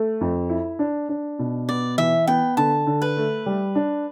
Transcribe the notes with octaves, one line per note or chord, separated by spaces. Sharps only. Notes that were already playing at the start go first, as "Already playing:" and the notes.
Already playing: A3
F2
E4
D4
D4
B2
B3 D5
E3 E5
B3 G5
D3 A5
D3
B4
A3
G3
D4